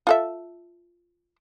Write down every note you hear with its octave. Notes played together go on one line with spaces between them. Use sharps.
F4 A4 E5